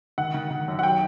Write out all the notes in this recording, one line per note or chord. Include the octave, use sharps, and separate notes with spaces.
D#3 F#5
D#3
D#3
F#2
F#5
F#3 G5